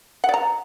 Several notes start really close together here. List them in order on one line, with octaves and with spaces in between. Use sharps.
F#5 D5 A#5